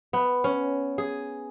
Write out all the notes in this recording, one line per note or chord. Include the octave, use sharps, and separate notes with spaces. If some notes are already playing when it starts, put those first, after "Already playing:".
B3
C#4
G#4